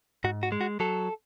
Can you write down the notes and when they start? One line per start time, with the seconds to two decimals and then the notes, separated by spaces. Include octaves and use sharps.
0.24 G#2 F#4
0.43 F#4
0.52 G#3
0.61 F#4
0.80 F#3 A4